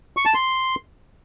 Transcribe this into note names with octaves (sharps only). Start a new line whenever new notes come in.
C#6
A5
C6